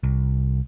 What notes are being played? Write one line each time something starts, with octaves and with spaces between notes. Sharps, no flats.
C2